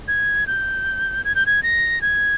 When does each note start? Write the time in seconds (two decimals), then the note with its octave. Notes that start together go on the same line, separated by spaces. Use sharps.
0.08 G#6
0.47 G6
1.24 G#6
1.35 G6
1.46 G#6
1.63 A#6
2.02 G#6